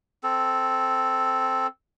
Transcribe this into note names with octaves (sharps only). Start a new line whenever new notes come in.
C4 A4